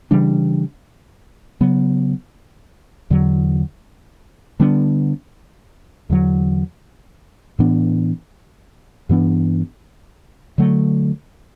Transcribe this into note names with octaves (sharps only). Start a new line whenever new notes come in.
C#3 E3 G3 D4
C#3 F#3 B3
E2 D3 F#3
D3 G3 B3 D4
E2 D3 F#3
A2 E3 B3 D4
G2 E3 B3 D4
D3 F#3 A3